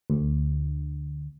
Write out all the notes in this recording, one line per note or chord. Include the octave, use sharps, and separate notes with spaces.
D2